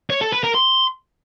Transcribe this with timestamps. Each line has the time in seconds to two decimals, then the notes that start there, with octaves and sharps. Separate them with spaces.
0.10 C#5
0.21 A4
0.32 B4
0.43 A#4
0.55 C6